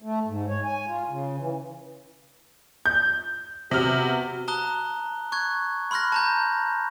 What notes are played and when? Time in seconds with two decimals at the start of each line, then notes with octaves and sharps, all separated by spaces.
0.02 A3
0.27 G#2
0.48 C#5
0.64 G#5
0.86 F4
1.09 C#3
1.38 E3
2.86 G6
3.71 C3 B3 F#4 F6
4.48 A5 A#5 D#6 F#6 G7
5.32 C#6 F#6 G#6
5.91 B5 C6 F6 F#6 A#6
6.12 A5 A#5 G6